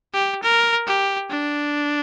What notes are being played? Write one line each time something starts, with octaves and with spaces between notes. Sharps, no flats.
G4
A#4
G4
D4